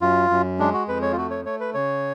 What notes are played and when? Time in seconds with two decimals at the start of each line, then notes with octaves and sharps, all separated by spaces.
0.01 F#2 F4
0.30 F#2
0.59 G#3 D4
0.73 F#4
0.88 F2 B4
1.02 C#5
1.12 F4
1.17 A3 F#4
1.31 C#5
1.45 A3 C#5
1.60 B4
1.74 C#3 C#5